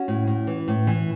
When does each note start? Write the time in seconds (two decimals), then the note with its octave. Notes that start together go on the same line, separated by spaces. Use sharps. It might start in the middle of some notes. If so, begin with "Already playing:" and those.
Already playing: C#4 F#4
0.08 A2
0.27 A2
0.47 E3
0.68 A2
0.87 E3